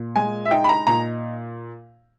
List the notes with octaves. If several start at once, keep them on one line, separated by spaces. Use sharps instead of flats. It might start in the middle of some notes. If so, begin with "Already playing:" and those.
Already playing: A#2
G#3 G#5
E5
D#4 G5
B5
A#5
A#2 A#5